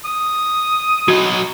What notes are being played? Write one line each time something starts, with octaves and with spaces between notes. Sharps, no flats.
D#6
F#3 F#4 D#5